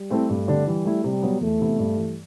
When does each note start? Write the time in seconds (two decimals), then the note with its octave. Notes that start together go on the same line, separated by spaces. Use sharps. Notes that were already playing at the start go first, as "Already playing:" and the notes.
Already playing: G3
0.10 A3 C4 E4 A4
0.29 G2 A3
0.48 D3 G3 D4
0.66 E3 G3
0.85 A3 E4
1.04 C3 G3
1.22 F#3 B3
1.41 E2 A3
1.60 C3 E3 B3 E4
1.79 G2
1.97 E3 G3